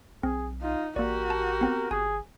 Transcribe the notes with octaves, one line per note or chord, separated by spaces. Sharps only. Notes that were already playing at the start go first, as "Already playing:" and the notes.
B1 C4 G#4
D#4 F4
A1 A#3 F#4 G4 A#4 D5
A5
B3 C4
G1 G#4 G#5